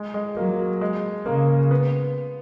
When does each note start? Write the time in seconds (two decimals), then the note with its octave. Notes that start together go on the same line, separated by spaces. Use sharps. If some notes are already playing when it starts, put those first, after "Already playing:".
Already playing: G#3
0.14 G#3
0.37 F#3 A#3
0.81 G#3
1.26 C#3 A#3
1.71 B3